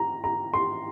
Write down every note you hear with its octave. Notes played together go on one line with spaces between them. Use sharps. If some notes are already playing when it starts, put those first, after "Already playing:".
Already playing: A#5
A#5
C6